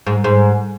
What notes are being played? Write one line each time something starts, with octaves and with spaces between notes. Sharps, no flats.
G#2
G#2